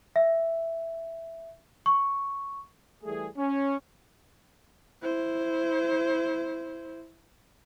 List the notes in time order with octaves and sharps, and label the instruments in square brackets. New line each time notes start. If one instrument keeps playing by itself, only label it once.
[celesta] E5
C#6
[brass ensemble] E3 G3 A3 G#4
C#4
[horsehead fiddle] E4 C5